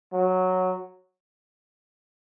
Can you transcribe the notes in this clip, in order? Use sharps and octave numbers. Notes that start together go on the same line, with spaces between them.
F#3